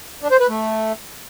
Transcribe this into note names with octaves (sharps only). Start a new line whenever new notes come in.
D4
C5
B4
A3